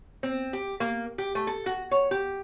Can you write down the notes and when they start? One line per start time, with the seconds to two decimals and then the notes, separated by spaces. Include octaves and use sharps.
0.23 C4
0.53 G4
0.80 A#3
1.18 G4
1.35 A3
1.47 A4
1.66 F#4
1.91 C#5
2.11 G4